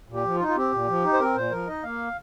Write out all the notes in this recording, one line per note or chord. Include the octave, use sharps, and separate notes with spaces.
A#2
G4
F3
F4
D#4
F4
C4 G4
A#2
F3
D#4
C5
C4 A#4
A#2 C5
F3 A#4
D#4 D#5
A#3 F5